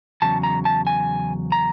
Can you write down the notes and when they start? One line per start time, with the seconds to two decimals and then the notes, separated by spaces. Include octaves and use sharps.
0.22 E2 C#3 F#3 A5
0.43 A#5
0.65 A5
0.87 G#5
1.52 A#5